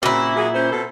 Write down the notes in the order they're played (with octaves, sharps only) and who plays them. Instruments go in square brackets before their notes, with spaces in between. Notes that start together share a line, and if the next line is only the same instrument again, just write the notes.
[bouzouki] A#2 E4 [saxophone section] C#3 C4 F#4
[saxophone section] F#3 A#3 G#4
C#4 C5
B2 C4 A4